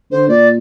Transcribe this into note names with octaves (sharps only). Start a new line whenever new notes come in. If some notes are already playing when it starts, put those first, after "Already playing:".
D3 C5
A#2 D5